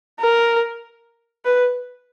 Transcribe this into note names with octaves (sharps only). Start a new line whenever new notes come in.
A#4
B4